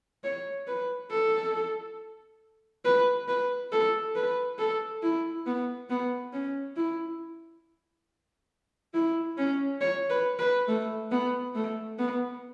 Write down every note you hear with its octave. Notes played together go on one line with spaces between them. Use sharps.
C#5
B4
A4
B4
B4
A4
B4
A4
E4
B3
B3
C#4
E4
E4
C#4
C#5
B4
B4
A3
B3
A3
B3